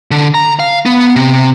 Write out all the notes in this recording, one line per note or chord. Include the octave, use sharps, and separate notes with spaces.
D3
A#5
F5
B3
C3